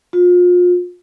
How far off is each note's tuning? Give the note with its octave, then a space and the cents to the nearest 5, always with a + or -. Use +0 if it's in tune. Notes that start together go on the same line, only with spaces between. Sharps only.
F4 +35